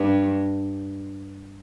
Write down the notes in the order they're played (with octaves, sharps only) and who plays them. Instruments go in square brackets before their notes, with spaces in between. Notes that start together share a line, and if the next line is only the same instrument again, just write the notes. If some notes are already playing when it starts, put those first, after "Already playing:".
Already playing: [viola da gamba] G2